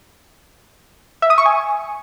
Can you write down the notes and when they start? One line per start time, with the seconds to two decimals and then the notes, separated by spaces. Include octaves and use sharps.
1.22 E5
1.30 D#6
1.38 C#6
1.46 G#5